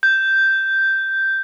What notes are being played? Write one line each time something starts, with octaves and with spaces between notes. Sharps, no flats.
G6